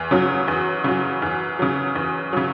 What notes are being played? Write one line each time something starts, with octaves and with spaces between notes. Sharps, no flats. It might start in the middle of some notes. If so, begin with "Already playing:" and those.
Already playing: E2
C#3 F#3
E2
C#3 F#3
E2
C#3 F#3
E2
C#3 F#3